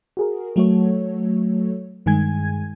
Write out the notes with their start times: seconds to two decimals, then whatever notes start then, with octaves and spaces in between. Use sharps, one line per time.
0.17 F#4 G#4 A#4
0.56 F#3 A3 F#4 A4 C#5
2.06 G2 D#3 G#3 G#5 G#6